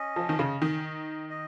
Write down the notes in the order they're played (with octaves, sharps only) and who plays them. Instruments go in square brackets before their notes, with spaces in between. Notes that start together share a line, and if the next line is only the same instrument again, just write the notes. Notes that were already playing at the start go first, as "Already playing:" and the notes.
Already playing: [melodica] C#4 D#5
[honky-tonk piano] F3
D#3
[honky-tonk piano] C#3 [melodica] D#5
[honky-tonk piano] D#3
[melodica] D#5
D#5